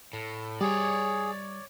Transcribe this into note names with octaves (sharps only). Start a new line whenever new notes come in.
A2
G3 G#4 C#5 D5